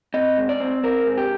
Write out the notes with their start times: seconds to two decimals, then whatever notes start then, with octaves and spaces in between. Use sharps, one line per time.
0.14 C4 D#5
0.37 G#2
0.49 D5
0.60 C4
0.83 C4 A#4
1.06 G#2
1.18 G4